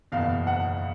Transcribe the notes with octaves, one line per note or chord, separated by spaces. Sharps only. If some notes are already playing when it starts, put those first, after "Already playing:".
F#1 E2 B2 F5
F#5